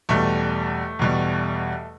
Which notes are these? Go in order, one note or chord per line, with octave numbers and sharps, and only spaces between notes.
E2 B2 G3 A3
E2 B2 G3